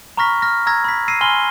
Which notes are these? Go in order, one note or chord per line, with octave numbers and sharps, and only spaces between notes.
A#5 B5 C#6 F6 A#6 B6
F6 A#6
A#5 E6 G#6 A#6
B5 B6
E6 A#6 C7 D#7
G#5 B5 C6 F6 G7